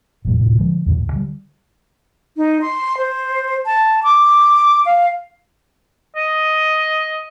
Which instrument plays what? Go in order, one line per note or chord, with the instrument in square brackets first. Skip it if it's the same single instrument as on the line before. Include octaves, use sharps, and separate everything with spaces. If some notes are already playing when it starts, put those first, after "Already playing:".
[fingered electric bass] F1 G2 A#2 F#3
D#1 A2 C3
D3 F3 G#3
E2 G#2 D3
D2
D3 G3
[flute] D#4
C6
C5
A5
D6
F5
[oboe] D#5